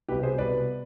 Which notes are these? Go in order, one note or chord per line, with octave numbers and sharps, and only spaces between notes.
C2 B2 G4 B4
G#4 C5
C2 B2 B4 D5